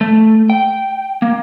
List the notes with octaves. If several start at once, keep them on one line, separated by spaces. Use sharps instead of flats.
A3
G5
A#3